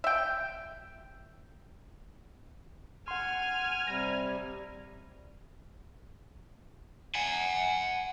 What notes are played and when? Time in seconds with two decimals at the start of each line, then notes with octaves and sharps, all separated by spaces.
0.04 E5 G5
3.08 F#5 G#5 C6 F6
3.87 C3 G3 A#6
7.15 F#5 G#5